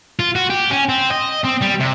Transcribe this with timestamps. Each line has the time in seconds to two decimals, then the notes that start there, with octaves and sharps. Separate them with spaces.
0.19 F4
0.35 F#4
0.50 G4
0.71 C#4
0.89 C4
1.11 D#5
1.45 C4
1.62 G3
1.80 C3